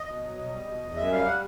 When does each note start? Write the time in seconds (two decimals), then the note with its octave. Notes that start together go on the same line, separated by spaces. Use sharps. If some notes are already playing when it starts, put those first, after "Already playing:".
Already playing: D#5
0.08 B2
0.23 F#3
0.38 B2
0.52 G3
0.67 B2
0.82 E2
0.96 F#2 E5
1.11 G3 F5
1.26 F#5